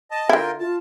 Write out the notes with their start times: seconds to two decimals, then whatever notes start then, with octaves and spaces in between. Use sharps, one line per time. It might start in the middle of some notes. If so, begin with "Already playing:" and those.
0.11 D#5 A5
0.29 D3 E4 F4 A#4 G5
0.60 F4 A5